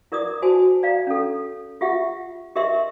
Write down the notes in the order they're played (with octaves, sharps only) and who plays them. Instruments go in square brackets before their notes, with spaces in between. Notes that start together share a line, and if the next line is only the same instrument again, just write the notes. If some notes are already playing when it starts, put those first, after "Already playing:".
[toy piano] E4 A#4 D5 D6 D#6
F#4 C5 G#5 A5
D5 F5 A#5
C#4 A4
F4 G4 E5 F#5
G4 A#4 D#5 E5 C6